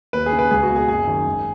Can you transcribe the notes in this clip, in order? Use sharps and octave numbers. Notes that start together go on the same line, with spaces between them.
D#2 B4
G#4
C#3
B4
C#2 G#4
F#4
B2
G#4
F#1 G#4
F#2 D#3
G#1